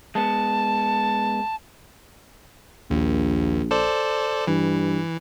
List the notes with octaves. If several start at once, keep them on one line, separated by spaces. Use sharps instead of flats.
G#3 B3 A5
A#1 D#2
A4 C5 D5
G2 E3